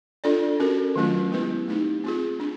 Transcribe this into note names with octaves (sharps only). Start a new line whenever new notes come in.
D4 F4 A4 D5
C#4 F#4 A#4
D#3 F#3 A3 C#4 F4
G#3 B3 E4 G4 B4
A3 C4 D#4 G4
C4 F4 G#4
D4